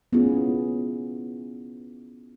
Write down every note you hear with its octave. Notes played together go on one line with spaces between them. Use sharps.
B3 C#4 E4 F4 G#4